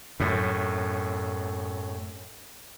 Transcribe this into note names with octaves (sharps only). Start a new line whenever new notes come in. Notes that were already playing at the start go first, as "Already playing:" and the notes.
F#2 A2